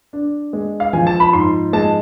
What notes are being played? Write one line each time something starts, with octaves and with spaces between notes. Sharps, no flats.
D4
G#3
F5
F3 G#5
A5
B5
G#2 C6
G#3 A5